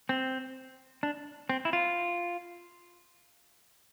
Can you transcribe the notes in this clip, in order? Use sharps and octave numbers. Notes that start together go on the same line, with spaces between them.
C4
D4
C4
E4
F4